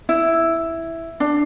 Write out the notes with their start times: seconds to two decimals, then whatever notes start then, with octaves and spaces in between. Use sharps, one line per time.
0.09 E4
1.20 D4